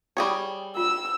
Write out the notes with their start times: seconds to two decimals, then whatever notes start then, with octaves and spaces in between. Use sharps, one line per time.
0.17 G3 G#4 C#5 G5 B5
0.77 F4 E6